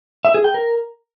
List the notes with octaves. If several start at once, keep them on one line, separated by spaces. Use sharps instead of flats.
E5
G#4
G5
A#4